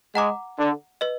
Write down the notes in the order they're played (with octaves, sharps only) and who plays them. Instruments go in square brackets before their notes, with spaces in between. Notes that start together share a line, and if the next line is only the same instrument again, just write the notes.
[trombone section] G#3 [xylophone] F#5 A#5 D6
[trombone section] D3
[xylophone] B4 D#5